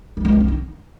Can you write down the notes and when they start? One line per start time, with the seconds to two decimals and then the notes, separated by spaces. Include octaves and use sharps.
0.17 G3
0.25 G#3
0.32 C4
0.40 C#4
0.48 D#4